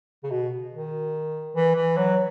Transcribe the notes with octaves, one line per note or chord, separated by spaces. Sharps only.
C#3
B2
D#3
E3
E3
F#3